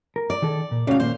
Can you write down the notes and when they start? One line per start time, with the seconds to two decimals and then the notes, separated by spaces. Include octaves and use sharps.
0.16 A#4
0.30 D5
0.42 D#3 G#4 A4
0.71 A#2
0.87 A2 C#3 F#4 D5 F5
1.00 D#2 A#2 A#3 C5